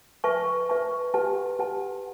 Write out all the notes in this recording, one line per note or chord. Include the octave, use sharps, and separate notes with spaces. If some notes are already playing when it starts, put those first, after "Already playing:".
B4 E5 A5 C#6
B4 E5 A5 C#6
G4 B4 F#5 A5
G4 B4 F#5 A5